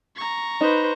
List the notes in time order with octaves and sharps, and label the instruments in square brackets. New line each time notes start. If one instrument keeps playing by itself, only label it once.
[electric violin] A#5 C#6
[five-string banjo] D#4 [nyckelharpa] B4 C5